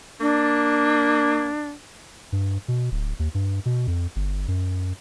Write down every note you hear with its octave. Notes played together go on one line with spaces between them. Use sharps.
A#3 D4
G2
B2
D1
D#2
G2
B2
F2
G1
F#2